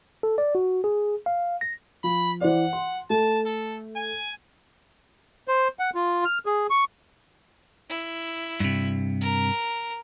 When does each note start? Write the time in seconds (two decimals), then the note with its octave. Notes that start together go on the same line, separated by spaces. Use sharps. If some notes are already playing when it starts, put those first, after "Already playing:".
0.23 A4
0.38 D5
0.55 F#4
0.84 G#4
1.26 F5
1.61 A#6
2.04 F3 B5
2.41 E3 C5 D5 F#5
2.73 C6
3.10 A3 A5
3.45 A4
3.96 G#5
5.48 C5
5.79 F#5
5.95 F4
6.25 F6
6.46 G#4
6.70 C#6
7.89 E4
8.60 G2 C3
9.21 A#4